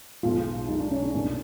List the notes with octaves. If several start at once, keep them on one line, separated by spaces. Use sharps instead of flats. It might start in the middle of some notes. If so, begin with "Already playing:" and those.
B1 B2 G#3 F4
B1 B2 G#3 D#4
D4
C#4
D4
C2 B2 F#3 A#3 D4 D#4